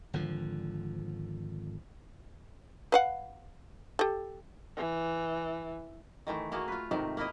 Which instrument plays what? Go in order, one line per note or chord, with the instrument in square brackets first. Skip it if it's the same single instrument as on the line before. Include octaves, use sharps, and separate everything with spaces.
[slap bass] G#1 D3 F3
[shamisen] B4 F5 F#5
G4 A4
[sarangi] E3
[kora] D#3 E3 A3
A3 A#3 F#4 G#4
F4 B4
G#2 C3 D#3 A3
A#3 E4 A#4 D#5